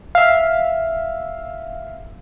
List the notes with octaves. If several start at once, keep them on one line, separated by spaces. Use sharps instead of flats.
E5 F5